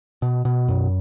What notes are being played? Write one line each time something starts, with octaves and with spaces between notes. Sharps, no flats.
B2
B2
F#2